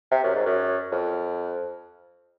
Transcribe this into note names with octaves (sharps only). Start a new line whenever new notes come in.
C3
F#2
G#2
F#2
F2